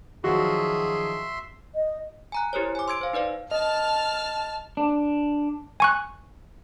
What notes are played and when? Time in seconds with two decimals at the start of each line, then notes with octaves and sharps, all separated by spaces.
0.24 D#3 F3 F#3 F#4 G#4 E5 C6
1.75 D#5
2.32 G#5 A#5 F#6
2.53 E4 G4 A#4 C5 C#5
2.75 G#5 D6
2.88 C6 E6 G#6 D7
3.01 C5 F5
3.13 D#4 B4 D5 F5
3.51 D#5 A5 F6
4.77 D4
5.80 G#5 C#6 F#6